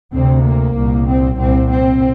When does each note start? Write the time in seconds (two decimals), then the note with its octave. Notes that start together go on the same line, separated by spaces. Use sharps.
0.12 D2 C3 C4
0.43 A#3
0.75 C2 A#2
1.07 C4
1.37 C2 A#2 C4
1.70 C4